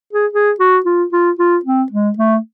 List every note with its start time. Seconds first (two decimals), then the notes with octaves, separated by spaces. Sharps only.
0.13 G#4
0.33 G#4
0.60 F#4
0.85 F4
1.12 F4
1.39 F4
1.65 C4
1.92 G#3
2.18 A3